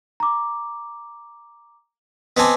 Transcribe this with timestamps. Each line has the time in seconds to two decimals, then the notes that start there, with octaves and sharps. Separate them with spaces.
0.20 A#5 D6
2.37 B3 C4 D#5 G#5 A5 D6